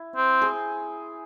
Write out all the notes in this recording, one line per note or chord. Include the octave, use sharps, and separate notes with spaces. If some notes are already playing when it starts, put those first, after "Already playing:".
Already playing: E4
C4
G#4